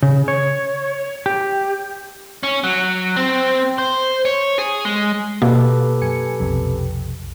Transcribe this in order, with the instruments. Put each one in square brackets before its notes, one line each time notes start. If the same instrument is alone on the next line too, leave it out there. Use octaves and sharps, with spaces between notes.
[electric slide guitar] C#3
C#5
G4
[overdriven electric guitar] C#4
F#3
C4
C5
C#5
G#4
G#3
[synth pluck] B2 A#3 [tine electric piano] G4 A4 B4
[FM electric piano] F#2 G#5 C#7
B1 F2 C3